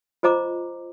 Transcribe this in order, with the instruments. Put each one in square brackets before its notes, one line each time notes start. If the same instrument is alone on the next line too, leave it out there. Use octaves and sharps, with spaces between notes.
[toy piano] F4 C5 D#5 A#5 D6